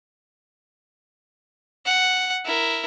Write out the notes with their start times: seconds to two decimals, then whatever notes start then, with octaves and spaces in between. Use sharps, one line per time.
1.86 F#5
2.45 E4 A#4